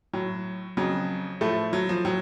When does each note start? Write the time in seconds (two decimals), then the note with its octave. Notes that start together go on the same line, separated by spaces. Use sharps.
0.14 A2 F#3
0.77 F2 C#3 F#3
1.41 A2 F3 A3
1.73 F#3
1.89 F3
2.05 A2 F#3